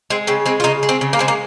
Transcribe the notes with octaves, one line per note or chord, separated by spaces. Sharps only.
G#3 C4
C#3 C4
G#3 C4
F4
C#3 D#4
G#3
C4
C#3
A#3
G#3 C4
A#3